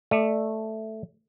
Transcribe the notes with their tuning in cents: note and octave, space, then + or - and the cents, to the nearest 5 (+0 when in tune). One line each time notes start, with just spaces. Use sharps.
A3 +0 D5 +20